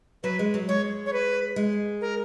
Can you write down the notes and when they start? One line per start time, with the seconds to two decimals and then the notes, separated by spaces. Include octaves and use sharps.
0.23 F#3 B4
0.39 G#3
0.54 F#3
0.68 G#3 C#5
1.06 C#5
1.13 B4
1.56 G#3
2.01 A#4